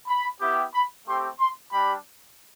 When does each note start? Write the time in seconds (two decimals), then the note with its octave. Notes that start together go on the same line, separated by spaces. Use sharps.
0.08 B5
0.41 B3 E4 G4
0.74 B5
1.06 A3 C4 G4 C6
1.39 C6
1.72 G3 D4 G4 B5